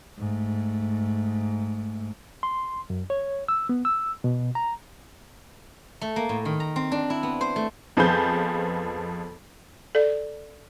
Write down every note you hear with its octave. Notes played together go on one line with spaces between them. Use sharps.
G#2 A3
C6
F#2
C#5
E6
B3
E6
B2
A#5
A3
A#3
A2
D#3
A#5
C4
D4
E4
B3
C5
A3
F2 F3 B3 G#4 B5 G6
A4 D5